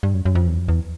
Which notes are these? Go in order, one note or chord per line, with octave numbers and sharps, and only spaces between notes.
G2
F#2
F#2
F2
E2
F2
E2